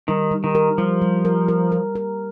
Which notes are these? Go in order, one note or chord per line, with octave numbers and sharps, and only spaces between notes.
D#3 G3
G3
D#3
A#4
F3 G3
G3
A#4
A#4
A#4
A#4